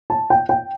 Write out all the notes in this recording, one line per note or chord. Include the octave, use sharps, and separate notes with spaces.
A5
G5
G5